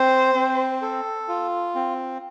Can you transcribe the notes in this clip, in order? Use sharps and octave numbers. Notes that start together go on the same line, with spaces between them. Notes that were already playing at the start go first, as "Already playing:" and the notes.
Already playing: C4 C5
C4
A4
F4
C4